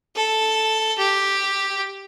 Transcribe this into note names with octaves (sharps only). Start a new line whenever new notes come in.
A4
G4